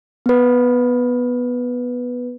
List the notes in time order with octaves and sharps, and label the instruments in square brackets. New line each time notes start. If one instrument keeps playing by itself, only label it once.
[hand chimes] B3 B4